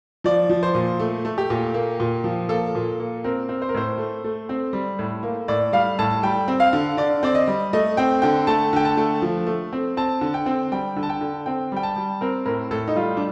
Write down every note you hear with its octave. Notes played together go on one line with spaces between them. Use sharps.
F3 D5
F3
C5
A#2
A3
A3
G4
A#2
A#3
A#2
F3
A#3 A4
A#2
A#3
C4 A#4
C4
C5
A#4
A2 C5
A3
A3
C4
G3
A2
A#3
A2 D5
G3 F5
A2 A5
G3 G5
C4
F5
D3
D3 D5
C4 D5
D#5
G3
A3 D#5
C4 G5
D3 G5
A3 A5
D3 G5
A5
A3
F3
A3
C4
C4 A5
D3
G5
C4
G3 G5
D3
A5
G5
D3
C4 G5
G3 G5
A5
G3
C4 A#4
A2 A#4
A2 A4
D#4
G3 F4
D4